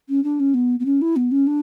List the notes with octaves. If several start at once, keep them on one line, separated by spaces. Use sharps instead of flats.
C#4
D4
C#4
B3
B3
C#4
E4
B3
C#4
D4